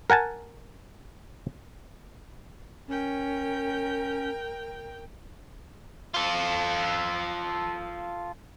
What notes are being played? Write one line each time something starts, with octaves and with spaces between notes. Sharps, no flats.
A#4 F#5 G#5 A5
C#4 A#4 G5
F4 A4